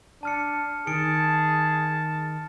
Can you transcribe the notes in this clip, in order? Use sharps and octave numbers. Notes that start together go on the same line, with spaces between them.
D4 A5 F6 C#7
D#3 G#4 A5 C#7 D7